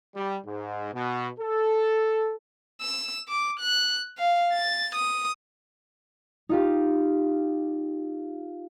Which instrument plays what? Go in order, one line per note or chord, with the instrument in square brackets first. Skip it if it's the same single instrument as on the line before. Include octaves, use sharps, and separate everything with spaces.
[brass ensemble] G3
G#2
B2
A4
[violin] E6
D6
F#6
F5
A6
D#6
[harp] D#4 F4 G4